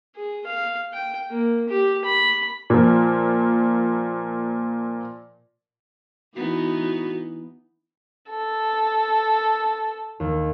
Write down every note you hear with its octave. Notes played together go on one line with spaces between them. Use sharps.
G#4
F5
G5
A#3
G4
B5
A#2 F3
E3 B3 D#4 F#4
A4
D#2